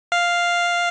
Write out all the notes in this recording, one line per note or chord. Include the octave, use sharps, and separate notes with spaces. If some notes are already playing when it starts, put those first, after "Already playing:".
F5